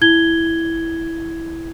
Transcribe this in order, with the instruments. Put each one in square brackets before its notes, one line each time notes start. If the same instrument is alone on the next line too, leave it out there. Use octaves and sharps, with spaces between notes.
[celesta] E4 G#6 G7